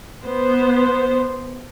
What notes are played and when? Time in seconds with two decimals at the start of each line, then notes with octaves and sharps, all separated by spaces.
0.24 B3 C5